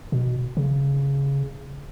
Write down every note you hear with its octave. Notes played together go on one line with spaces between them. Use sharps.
B2
C#3